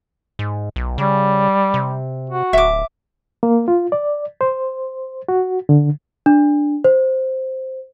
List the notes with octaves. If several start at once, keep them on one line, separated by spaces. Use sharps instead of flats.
G#2
B1
C#3 G3
C3
F#4
D1 E5 D6
A#3
F4
D5
C5
F#4
D3
D4
C5